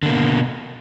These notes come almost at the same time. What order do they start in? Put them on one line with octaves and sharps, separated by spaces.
D3 A#3 B2